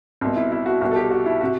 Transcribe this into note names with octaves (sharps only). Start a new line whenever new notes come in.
C2 B2 C4
E4
E4
F#4
C2 B2 F#4
A4
G4
F#4
E4
C3 F#4